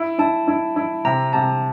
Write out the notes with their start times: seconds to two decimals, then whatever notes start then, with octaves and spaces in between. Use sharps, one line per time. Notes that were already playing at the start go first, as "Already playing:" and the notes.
Already playing: E4
0.19 E4 A5
0.48 E4
0.76 E4
1.05 C3 A#5
1.33 C3 A5